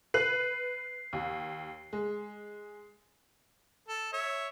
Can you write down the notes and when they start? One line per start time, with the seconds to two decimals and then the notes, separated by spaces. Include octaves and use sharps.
0.14 B4 F#6 C7
1.13 D#2
1.93 G#3
3.88 A4
4.13 C#5 E5